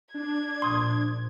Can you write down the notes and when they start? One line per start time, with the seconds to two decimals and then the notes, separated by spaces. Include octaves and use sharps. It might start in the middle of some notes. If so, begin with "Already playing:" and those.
0.14 D4 G#6
0.62 A#1 C6 D#6